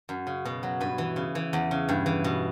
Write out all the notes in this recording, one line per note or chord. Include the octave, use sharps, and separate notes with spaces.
F#2
C#3
B2
F#3
G2 B4
E3
C#3
E3
E2
C#3
G2
E3
B2